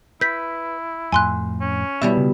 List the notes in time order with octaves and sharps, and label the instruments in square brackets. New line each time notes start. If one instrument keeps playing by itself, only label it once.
[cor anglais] E4 [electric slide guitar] B4 [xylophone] G6 B6
[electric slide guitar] F2 A2 [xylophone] G#5 C6 F#6
[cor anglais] C#4
[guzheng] B2 G3 E4 [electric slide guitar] E5
[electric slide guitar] C#3